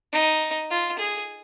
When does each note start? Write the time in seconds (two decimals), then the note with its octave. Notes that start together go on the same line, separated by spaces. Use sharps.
0.13 D#4
0.70 F4
0.99 G#4